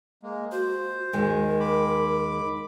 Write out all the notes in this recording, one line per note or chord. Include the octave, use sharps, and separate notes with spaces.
G#3 A#3
F#4 C5
D#2 D#3 G#3 A#4
B5 D6